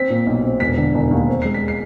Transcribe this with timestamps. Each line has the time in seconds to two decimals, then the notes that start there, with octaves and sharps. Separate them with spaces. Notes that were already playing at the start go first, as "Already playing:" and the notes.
Already playing: C4 B6
0.10 A#2
0.27 B1
0.44 C4
0.60 E1 B6
0.78 D3
0.95 E1
1.11 D#2
1.29 C4
1.42 G#3 C7
1.54 B6
1.68 C7